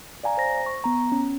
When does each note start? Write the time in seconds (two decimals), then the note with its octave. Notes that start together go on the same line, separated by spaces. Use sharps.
0.23 D5 F5 G#5 A#5
0.38 C5 A#6
0.66 C#6
0.84 B3 A#5
1.12 C#4